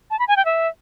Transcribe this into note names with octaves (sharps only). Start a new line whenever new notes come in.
A5
B5
G#5
G5
E5